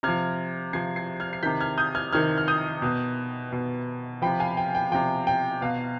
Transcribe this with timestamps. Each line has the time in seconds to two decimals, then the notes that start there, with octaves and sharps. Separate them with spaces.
0.03 C3 F3 F6 G#6
0.73 C3 F3 G#6 C7
0.96 G#6 C7
1.20 F6 G#6
1.33 C7
1.43 C3 D#3 G6 B6
1.60 F6 G#6
1.78 D#6 G6
1.95 F6 G#6
2.13 C3 D#3 F6 G#6
2.38 F6
2.48 D#6 G6
2.82 B2
3.53 B2
4.22 C3 F3 G5 B5
4.40 F5 G#5
4.57 G5
4.75 G5
4.92 C3 F3 G5
5.27 G5
5.62 B2 F5